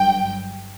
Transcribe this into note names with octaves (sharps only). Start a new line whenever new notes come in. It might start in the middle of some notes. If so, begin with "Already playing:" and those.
Already playing: G1 G2 F#3 G5